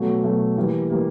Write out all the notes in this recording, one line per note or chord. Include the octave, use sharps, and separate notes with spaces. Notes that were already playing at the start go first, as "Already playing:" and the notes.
Already playing: B2 F#3 A3
B2 F#3 A3
E3 G3 A#3
E3 G3 A#3